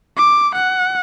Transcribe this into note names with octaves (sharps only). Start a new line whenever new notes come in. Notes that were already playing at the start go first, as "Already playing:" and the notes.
D6
F#5